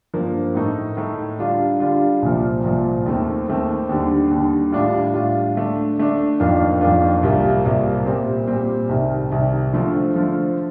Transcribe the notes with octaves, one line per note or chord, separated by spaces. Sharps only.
G2 F3 A#3
A2 A3 D#4
A2 A3 D#4
D3 G3 D4 F4
D3 G3 D4 F4
C2 A#2 F3
C2 A#2 F3
D#2 D#3 A3 C4
D#2 D#3 A3 C4
D#2 D3 G3
D#2 D3 G3
A2 G3 D4 F4
A2 G3 D4 F4
D3 A3 D4
D3 A3 D4
F2 D#3 A#3 D4 F4
F2 D#3 A#3 D4 F4
C2 C3 G3 A#3 F4
C2 C3 G3 A#3 F4
A#2 G3 C4
A#2 G3 C4
C2 C3 D#3
C2 C3 D#3
D3 F3 A3
D3 F3 A3